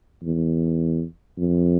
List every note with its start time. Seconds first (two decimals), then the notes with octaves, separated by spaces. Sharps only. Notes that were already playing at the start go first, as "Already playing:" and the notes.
0.22 E2
1.38 F2